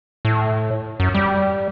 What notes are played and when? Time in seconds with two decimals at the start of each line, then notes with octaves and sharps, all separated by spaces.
0.25 A2
1.00 F#2
1.15 G3